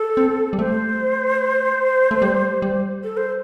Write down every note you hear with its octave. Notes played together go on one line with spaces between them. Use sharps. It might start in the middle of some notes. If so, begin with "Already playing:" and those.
Already playing: A4
C4
G3
A3 C5
A3
G3
G3
A4
C5